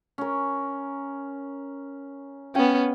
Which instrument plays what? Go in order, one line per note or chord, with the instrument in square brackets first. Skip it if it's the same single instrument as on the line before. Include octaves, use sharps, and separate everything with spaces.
[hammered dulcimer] C#4 A#4
[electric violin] B3 C#4 [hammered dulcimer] F5 G5